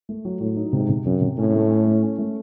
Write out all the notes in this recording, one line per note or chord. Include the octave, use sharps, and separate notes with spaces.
A3
F#3
A2 F#3
D#4
G#2 C3
C3
F#2 C3
C3
A2 C#4
A3
C#4
A3
C#4
A3